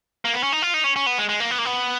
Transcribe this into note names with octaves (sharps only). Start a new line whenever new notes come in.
A#3
B3
C#4
D#4
F4
D#4
C#4
C#4
B3
G#3
G#3
A#3
B3
A#3
B3